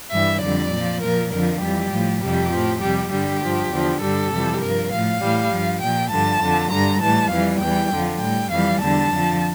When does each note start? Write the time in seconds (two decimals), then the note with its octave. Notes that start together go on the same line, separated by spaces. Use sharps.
0.12 G2 E3 G3 E5
0.41 F2 D3 G3 D5
0.72 A#2 F3
1.01 A#2 F3 A#4
1.32 F2 D3 F3 A#4
1.61 F2 E3 G3 G4
1.92 A2 F3
2.22 F2 C3 G3 G4
2.52 A2 F3
2.81 F2 C3 G3 G4
3.11 G2 D3 G3 G4
3.41 G2 F3
3.71 E2 D3 F3
4.01 G2 D3 G3 A4
4.32 F2 C3 E3 G3
4.61 G2 F3 A#4
4.91 A2 F3 F5
5.21 A2 E3 G3
5.51 G2 F3
5.81 A#2 F3 G5
6.11 G2 D3 F3 A5
6.41 F2 D3 F3
6.71 G2 D3 G3 A#5
7.01 A2 E3 G3 A5
7.31 F2 E3 G3 F5
7.61 E2 E3 G3 G5
7.91 F2 D3 F3
8.21 A2 G3 G5
8.51 F2 E3 G3 F5
8.81 E2 D3 G3 A5
9.11 F2 D3 F3